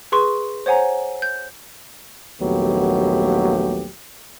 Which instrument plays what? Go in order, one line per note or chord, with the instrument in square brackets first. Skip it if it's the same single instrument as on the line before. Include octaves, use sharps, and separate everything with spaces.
[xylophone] G#4 B4 C6 C#6
C5 C#5 F#5 G#5 A#5
G6
[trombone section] A#1 D#2 F#3 A3 B3 G4